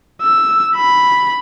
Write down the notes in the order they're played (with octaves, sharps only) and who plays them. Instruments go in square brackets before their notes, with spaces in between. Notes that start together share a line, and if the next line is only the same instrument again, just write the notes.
[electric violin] E6
B5